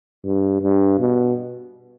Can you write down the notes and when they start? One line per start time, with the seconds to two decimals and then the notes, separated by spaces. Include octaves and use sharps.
0.24 G2
0.62 G2
0.99 B2